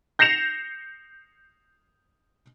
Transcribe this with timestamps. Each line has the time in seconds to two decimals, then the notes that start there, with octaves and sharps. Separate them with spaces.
0.19 G6 A#6 C7 C#7 E7 F7